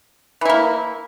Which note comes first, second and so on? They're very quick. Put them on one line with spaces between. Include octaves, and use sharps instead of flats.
E3 E4 A#3